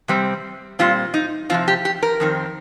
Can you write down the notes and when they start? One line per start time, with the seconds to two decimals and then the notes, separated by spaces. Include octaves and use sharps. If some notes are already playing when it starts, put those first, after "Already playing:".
0.08 C3 G3 C4
0.79 A#2 G3 C4 F4
1.14 D#4
1.50 C3 F3 C4 F4
1.68 G4
1.85 G4
2.03 A#4
2.20 F2 D#3 C4